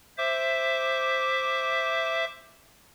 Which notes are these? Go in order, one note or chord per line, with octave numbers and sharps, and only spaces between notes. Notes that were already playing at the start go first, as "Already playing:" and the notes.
C5 E5 D6